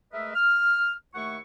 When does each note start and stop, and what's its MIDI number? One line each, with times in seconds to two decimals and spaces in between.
0.13 0.35 56
0.13 0.35 57
0.13 0.35 70
0.13 0.35 71
0.13 0.35 75
0.13 0.35 76
0.35 0.93 89
1.15 1.38 39
1.15 1.38 57
1.15 1.38 64
1.15 1.38 78
1.15 1.38 85